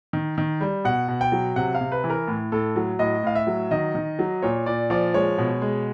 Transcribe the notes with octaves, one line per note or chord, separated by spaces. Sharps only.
D#3
D#3
G3
B2 F#5
B2
G5
F#3
C3 F#5
F5
C3
B4
E3
A#4
A2
A2 A4
F#3
A2 D#5
A2 F5
E5
F#3
D#3 D#5
D#3
F#3
A#2 C#5
A#2 D5
F3 D5
G#3 C#5
B2
G#3